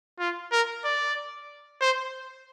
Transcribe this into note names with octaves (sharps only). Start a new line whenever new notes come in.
F4
A#4
D5
C5